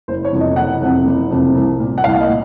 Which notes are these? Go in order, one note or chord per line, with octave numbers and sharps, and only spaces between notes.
F#1 C5
C#5
F2 C3
D#5
F#1 F#5
F2 C3
F#1
F2 C3
C2
A#2
F#5
C2 F5
D#5
A#2